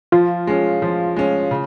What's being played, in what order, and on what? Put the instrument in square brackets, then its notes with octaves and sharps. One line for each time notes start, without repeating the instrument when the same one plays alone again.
[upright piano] F3 [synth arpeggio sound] F4
[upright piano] G#3 C#4
F3
G#3 C#4
C#3